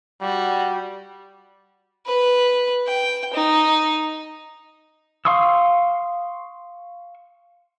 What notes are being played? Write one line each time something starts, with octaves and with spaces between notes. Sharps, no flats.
G3 F#4
B4
G5
D#4
F5 C6 C#6 D#6 E6